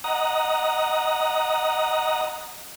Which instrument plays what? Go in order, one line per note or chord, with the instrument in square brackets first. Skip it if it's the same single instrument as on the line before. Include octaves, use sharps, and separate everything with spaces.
[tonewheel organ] D#5 F#5 A#5